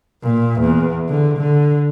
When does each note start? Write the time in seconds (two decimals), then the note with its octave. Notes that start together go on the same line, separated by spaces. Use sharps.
0.23 A#2
0.61 E2
1.09 D3
1.38 D3